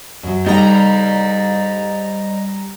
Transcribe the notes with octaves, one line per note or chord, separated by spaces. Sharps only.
F#2 F#3
G3 D#4 A4 C5 D#5 A#5